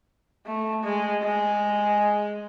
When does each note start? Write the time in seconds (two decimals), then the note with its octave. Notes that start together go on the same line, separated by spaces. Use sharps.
0.46 A3
0.84 G#3
1.23 G#3